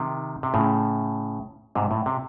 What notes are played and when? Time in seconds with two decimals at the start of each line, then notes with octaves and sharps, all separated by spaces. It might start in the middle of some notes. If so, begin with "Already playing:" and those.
Already playing: C3 D#3
0.43 C3
0.54 A2 C#3
1.75 G#2 C3
1.91 A2
2.06 C3